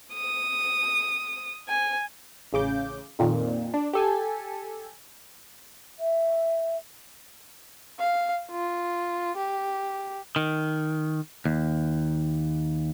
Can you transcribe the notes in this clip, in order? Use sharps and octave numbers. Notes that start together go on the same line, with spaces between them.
D#6
G#5
A1 C#3 D6 G6
F2 A#2 D#3
D4
G4 A4 G#5
E5
F5
F4
G4
D#3
D#2